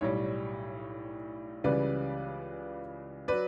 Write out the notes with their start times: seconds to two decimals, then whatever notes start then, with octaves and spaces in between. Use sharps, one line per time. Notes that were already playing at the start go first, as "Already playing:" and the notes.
0.01 B1 A2 G3 C#5
1.64 C#2 C#3 E3 G3 B4 D5
3.28 F#3 B4 D5